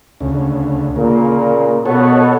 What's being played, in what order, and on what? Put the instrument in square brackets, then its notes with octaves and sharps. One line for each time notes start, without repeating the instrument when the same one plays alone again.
[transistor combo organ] D2 C#3
[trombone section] A#2 C#3 [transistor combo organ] A#3
[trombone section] B2 B3 [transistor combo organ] F#4 A4 C#5